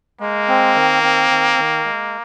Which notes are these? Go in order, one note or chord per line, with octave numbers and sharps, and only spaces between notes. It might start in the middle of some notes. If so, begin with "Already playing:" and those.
G#3 A#3
C4
D#3
C4
D#3
D#3
G#3